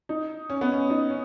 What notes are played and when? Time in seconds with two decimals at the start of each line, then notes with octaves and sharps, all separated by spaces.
0.09 D#4
0.50 C#4
0.61 B3
0.72 C#4
0.90 D#4
1.10 C#4